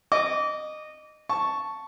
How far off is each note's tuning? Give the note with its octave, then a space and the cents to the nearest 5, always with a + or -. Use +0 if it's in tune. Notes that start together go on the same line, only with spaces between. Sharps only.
D#5 -20 D6 -30
A5 +0 C#6 +0